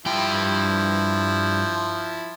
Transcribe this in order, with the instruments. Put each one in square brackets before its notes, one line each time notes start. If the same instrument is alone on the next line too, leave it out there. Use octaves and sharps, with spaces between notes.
[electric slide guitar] G2 G5 [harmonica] F3 E4